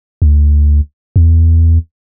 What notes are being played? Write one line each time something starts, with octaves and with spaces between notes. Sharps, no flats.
D2
E2